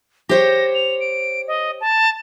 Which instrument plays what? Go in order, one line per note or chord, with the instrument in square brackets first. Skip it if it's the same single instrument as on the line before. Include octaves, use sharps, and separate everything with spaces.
[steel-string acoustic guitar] G4 C5 C#5 [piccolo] A#6
[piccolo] F7
D7
D#5
A5